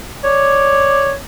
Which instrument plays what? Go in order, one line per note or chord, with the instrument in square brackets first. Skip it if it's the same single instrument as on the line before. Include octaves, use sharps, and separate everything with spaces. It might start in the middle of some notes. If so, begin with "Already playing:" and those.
[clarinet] C#5 [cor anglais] D5